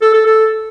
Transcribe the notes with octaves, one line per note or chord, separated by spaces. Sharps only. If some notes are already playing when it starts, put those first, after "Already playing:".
A4
A4
A4